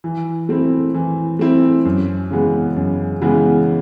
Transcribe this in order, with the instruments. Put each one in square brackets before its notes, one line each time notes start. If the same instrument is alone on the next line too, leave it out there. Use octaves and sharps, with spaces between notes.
[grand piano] E3
A3 C4 E4
E3
A3 C4 E4
F#2
C#3 E3 G#3 B3
F#2
C#3 E3 G#3 B3